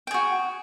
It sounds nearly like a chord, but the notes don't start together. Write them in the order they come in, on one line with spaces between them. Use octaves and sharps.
G5 G#4 F#4